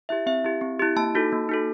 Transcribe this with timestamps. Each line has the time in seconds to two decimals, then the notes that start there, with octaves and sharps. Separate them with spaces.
0.09 E4 G4 E5
0.26 C4 E5
0.44 E4 G4
0.61 C4
0.80 E4 G4
0.96 A#3 A5
1.15 D#4 F#4 A4
1.32 A#3
1.49 D#4 F#4 A4